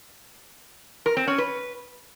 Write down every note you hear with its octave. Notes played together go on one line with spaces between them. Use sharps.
A#4
C4
C#4
B4